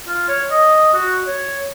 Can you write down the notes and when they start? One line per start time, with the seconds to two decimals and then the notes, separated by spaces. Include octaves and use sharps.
0.08 F4
0.28 C#5
0.51 D#5
0.93 F#4
1.26 C#5